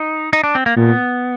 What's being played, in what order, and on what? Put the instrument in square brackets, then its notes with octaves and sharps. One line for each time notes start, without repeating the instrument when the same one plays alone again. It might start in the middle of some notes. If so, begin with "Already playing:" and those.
Already playing: [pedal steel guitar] D#4
D#4
D4
C4
A#3
[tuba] A#2 [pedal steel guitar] B3